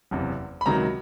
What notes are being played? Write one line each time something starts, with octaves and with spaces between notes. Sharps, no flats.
F#1 E2 C3
B5
C#2 C3 D#3 F#3 A#5